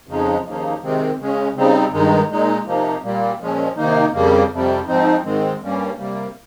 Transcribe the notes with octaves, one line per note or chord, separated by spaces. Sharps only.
F2 C#3 F3 G#3 D#4
D#2 C#3 F3 A#3 D#4
C3 D#3 G#3 C4
C#3 G#3 C#4
C#3 G3 C4 D#4
G2 D#3 G#3 D#4
A#2 G#3 D#4
C3 F3 A#3 D#4
A#2 G3 A#3
A#2 F3 G#3 C#4
C3 D#3 A#3 D#4
F2 C#3 G3 A#3
F2 C3 G3
G#2 F3 C4 D#4
G#2 D#3 G#3 C4
G2 G3 A#3 C#4
C3 G3 A#3